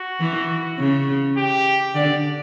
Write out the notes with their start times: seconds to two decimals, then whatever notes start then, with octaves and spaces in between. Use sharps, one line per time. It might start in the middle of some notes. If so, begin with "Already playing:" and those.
Already playing: F#4
0.20 E3
0.79 C#3
1.37 G4
1.95 D3 D5